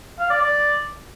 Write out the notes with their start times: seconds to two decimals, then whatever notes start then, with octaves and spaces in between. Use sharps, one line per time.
0.19 F5
0.30 D5
0.42 D5